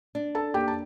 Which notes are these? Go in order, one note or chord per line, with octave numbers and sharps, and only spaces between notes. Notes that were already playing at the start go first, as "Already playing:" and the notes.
D4
A4 A5
A#3 G4 G5
A5